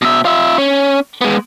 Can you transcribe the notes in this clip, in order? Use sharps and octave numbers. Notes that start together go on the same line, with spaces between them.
B2 E5
F4 E5
C#4
G#3 B3